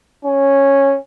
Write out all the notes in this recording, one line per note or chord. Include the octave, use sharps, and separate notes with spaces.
C#4